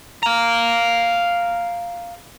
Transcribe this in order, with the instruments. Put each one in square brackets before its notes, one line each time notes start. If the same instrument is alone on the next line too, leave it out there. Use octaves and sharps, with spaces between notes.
[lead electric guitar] F5 A#5